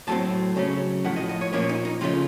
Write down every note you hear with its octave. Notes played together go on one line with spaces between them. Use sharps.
A2 F#3 A3 C4 A5
C#3 F#3 A3 C#4
A2 F3 A3 F#5
D#5
D#5
C#5
A#2 F3 A#3 C#4 C#5
D#4
D#4
C#3 F3 A3 C#4 F4